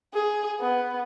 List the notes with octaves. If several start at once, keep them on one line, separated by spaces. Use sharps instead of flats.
G#4
B3